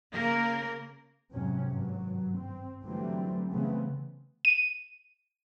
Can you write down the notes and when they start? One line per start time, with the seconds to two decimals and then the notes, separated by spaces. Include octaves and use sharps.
0.15 C#3 A#3 A#4
1.32 F2 G#2 C3 F#3 C#4
1.70 G#1 G2 F#3
2.39 C4
2.83 D3 E3 F#3 G3 A3 C4
3.51 C#3 E3 A3 B3 C4
4.45 D#7